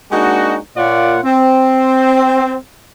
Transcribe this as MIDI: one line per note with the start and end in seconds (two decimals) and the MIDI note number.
0.12 0.57 56
0.12 0.57 58
0.12 0.57 62
0.12 0.57 63
0.12 0.57 66
0.77 1.18 46
0.77 1.18 58
0.77 1.18 65
0.77 1.18 73
0.77 1.18 74
0.77 1.18 78
1.24 2.56 60